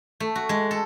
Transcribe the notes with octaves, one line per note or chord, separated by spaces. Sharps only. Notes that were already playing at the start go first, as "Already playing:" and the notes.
A3
F#4
G#3
A4